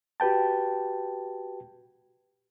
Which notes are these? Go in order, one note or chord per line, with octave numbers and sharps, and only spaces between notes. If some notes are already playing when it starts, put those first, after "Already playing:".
F#4 G4 B4 G5 A5